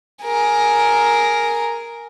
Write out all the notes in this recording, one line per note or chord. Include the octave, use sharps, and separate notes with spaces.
G#4 A#4